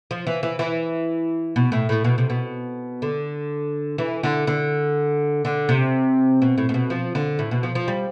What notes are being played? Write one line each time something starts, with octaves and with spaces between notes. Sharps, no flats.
F3
E3
E3
E3
B2
A2
A2
B2
C3
B2
D3
E3
D3
D3
D3
C3
B2
A2
A2
B2
F3
D3
A2
B2
F3
F3
G3